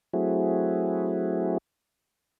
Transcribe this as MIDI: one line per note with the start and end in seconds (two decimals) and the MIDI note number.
0.13 1.58 54
0.13 1.58 57
0.13 1.58 60
0.13 1.58 64
0.13 1.58 66
0.13 1.58 68